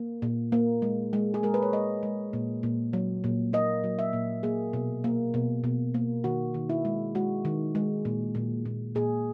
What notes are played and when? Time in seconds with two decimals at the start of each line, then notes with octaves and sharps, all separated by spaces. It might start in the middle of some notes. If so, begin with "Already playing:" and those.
Already playing: A#3
0.22 A#2
0.52 A#3
0.82 G#3
1.13 G#3
1.34 G#4
1.43 G#3 A#4
1.54 B4
1.62 C#5
1.73 G#3 D#5
2.03 G#3
2.33 A#2
2.63 A#2
2.93 F#3
3.24 A#2
3.53 A#3 D#5
3.84 F#3
3.99 E5
4.13 A#2
4.43 A#3 G#4
4.73 B2
5.04 A#3
5.34 B2
5.64 B2
5.94 A#3
6.24 D#3 F#4
6.54 D#3
6.70 E4
6.85 G#3
7.15 G#3 F#4
7.45 D#3
7.75 G#3
8.05 A#2
8.35 A#2
8.65 A#2
8.95 A#2 G#4